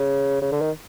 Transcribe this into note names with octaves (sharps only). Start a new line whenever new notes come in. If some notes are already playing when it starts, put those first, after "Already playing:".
Already playing: C#3
C#3
D3
D#3